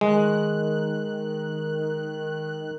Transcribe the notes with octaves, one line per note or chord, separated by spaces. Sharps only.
D#3 G#3 F#6